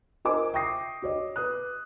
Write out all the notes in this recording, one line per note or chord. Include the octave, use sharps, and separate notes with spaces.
F4 A#4 C5 D#5 G#5 D6
E5 G5 C#6 D#6 A#6 C7
F#4 C#5 D#5
B4 D#6 F#6